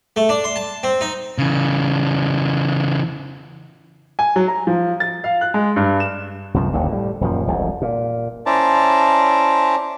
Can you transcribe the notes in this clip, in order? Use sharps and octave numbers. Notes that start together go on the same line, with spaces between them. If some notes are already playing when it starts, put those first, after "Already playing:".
A3
D4
C6
A5
C4
D#4
C#3 E3
G#5
F#3
A#5
F3
A6
F5
F#6
G#3
G2
E7
C2 F#2 B2 F3
F#1 D#2 D3
A2 G3
D#1 F#2 F3
E1 C2 F2
A#2
C#4 E4 C5 D5 A5 A#5